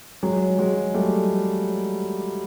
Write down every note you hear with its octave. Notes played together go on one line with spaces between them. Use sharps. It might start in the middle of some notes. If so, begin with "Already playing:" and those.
F#3 G#3
F#3 G#3
G3 A3